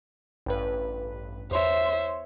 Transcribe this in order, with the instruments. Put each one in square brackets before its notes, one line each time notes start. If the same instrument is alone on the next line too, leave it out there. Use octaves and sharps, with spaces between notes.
[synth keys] A1 G2 B4
[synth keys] E2 C#5 C6 [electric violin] C5 E5